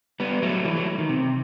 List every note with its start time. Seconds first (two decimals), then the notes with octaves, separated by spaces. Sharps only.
0.20 G3 B3
0.42 F#3 A3
0.64 E3 G3
0.76 F#3 A3
0.98 D#3
1.09 C3